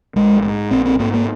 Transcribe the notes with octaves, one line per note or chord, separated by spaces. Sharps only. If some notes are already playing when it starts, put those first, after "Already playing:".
A#1 G#3
G#2
A#1 C4
C4
G#2 A#3
A#3